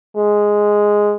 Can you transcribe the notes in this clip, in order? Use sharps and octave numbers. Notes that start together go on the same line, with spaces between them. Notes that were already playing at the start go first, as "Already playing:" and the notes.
G#3